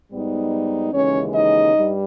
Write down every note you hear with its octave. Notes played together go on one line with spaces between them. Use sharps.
G#2 G3 B3 D#4
D#2 C#3 E3 G#3 C#4 D#4 C#5
D#4 D#5
G2 G3